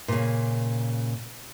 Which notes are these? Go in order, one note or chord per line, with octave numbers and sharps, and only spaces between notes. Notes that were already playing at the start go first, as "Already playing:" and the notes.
A#2 C#3